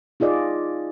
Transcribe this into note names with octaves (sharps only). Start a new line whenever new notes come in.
D#4 F4 G#4 D5 D#5